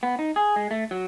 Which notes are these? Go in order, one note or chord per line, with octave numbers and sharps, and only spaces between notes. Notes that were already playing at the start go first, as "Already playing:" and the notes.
B3
D#4
G#4
G#3
A3
F#3